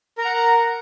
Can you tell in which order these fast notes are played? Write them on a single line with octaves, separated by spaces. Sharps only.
A#4 A#5 F#5